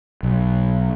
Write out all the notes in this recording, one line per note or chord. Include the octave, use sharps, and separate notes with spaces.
B1